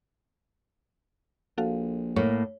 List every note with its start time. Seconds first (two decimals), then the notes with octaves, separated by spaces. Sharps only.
1.58 A#1 F#4 A4 F5
2.16 A2 A#3 C#5